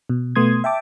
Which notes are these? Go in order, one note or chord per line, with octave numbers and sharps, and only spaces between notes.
B2
B2 A3 B3 C6 D#6 G#6
E5 G5 A5 D6